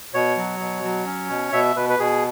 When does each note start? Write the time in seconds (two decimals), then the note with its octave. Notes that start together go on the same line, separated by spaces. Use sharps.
0.14 B2 C#5
0.37 F#3
0.60 B2
0.84 F#3
1.06 C#4
1.30 B2
1.53 B2 E5
1.76 B2 B4
1.89 B4
1.99 B2 G#4